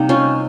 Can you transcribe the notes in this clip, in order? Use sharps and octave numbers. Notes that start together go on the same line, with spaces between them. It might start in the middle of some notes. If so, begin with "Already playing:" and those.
Already playing: C3 G3 A#3 D#4
C#4 F4